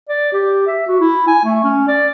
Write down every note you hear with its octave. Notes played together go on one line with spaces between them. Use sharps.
D5
G4
E5
F#4
E4
G#5
A3
C#4
D5